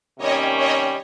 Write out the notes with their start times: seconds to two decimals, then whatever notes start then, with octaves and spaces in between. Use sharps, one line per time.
0.18 C3 D#3 G3 A#3 C#4 C#5 D#5
0.57 C#5 D#5